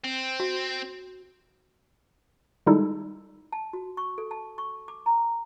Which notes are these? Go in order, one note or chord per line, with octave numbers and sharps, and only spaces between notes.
C4
F#4
D#3 G3 G#3 D#4 E4 A4
A5
F#4
C#6
A4
A5
C#6
D6
A#5